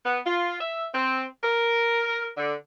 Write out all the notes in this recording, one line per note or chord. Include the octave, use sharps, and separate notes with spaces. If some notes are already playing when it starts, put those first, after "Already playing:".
B3
F4
E5
C4
A#4
D3